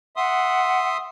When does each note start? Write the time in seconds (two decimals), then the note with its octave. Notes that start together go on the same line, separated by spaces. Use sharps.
0.16 E5 F#5 C6 D#6